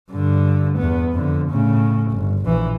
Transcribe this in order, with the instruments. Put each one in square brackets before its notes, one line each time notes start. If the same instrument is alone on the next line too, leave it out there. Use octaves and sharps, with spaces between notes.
[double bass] G2 D3
E2 B3
F2 D3
A2 C#3
G1
A#1 E3